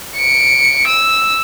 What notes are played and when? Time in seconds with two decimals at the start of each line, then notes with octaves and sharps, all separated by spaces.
0.18 C#7 D7
0.87 E6